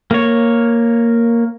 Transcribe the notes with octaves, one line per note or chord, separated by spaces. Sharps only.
A#3 C#5